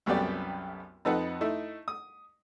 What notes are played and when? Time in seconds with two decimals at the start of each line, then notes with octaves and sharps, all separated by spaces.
0.06 C2 F#2 A3 B3 G4 D5
1.05 F2 D#4 A4 B4 F#5
1.41 A3 D#4 E4
1.88 D#6